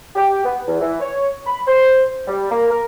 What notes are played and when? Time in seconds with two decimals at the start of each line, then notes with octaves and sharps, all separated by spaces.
0.16 G4
0.45 B3
0.68 E2
0.81 E3
1.01 C#5
1.46 B5
1.67 C5
2.27 G3
2.50 A#3
2.70 A#4